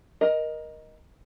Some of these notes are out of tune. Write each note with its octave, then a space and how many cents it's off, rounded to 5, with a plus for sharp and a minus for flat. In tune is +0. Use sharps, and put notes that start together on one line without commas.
A#4 +20 D#5 +0